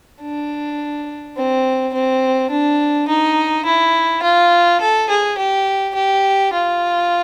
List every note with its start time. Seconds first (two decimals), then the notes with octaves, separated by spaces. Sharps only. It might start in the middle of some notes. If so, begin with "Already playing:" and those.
0.22 D4
1.37 C4
1.94 C4
2.50 D4
3.08 D#4
3.65 E4
4.22 F4
4.81 A4
5.09 G#4
5.38 G4
5.95 G4
6.53 F4